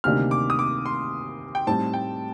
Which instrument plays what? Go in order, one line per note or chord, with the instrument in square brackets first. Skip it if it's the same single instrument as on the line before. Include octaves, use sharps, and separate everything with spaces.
[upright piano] D2 C3 D#3 A#3 D4 [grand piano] F6
[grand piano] D6
D#6
D6
C6
G5
[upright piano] A2 G3 C4 D#4 [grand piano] A5
[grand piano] G5